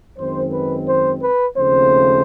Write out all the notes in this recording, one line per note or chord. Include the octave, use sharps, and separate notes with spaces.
F#2 D#3 G#3 C4 C5
B4
C5
B4
D#2 C#3 F3 A3 C4 C5